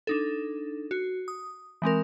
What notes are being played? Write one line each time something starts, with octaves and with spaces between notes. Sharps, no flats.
D4 D#4 A4
F#4
D#6
E3 G#3 C4 A#4